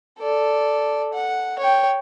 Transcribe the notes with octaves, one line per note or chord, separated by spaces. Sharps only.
A4 D5
F#5
C#5 G5